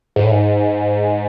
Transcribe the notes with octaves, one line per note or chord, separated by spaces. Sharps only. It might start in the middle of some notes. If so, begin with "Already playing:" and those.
G#2
A2
G#2